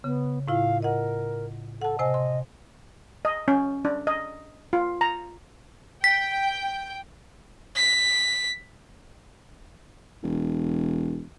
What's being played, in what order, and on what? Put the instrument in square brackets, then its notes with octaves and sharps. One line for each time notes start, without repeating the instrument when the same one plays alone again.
[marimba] C#3 [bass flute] B3
[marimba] A2 E4 F4 [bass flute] F5
[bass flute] A#4 [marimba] D#5 F#5
[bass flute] A4 [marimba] F#5 A5
[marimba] C3 C5 G#5 [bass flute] D#5
[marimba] C6
[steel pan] D#5
C#4
D4
D#5
F4
A#5
[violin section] G5 [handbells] B6
[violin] B6
[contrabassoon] E1